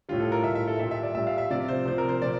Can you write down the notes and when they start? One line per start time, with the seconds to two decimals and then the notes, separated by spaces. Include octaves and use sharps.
0.09 A2 G3 F4
0.20 A4
0.32 A#4
0.44 A2 G3 E5
0.55 E5
0.67 A4
0.80 A#2 G3 E5
0.91 E5
1.03 D5
1.15 A#2 G3 E5
1.27 F5
1.38 E5
1.50 C3 F3 D5
1.68 C5
1.85 C3 F3 C5
1.98 A#4
2.09 C5
2.21 A#2 F3 D5